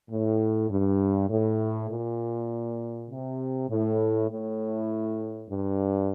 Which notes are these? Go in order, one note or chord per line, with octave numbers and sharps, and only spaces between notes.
A2
G2
A2
A#2
C3
A2
A2
G2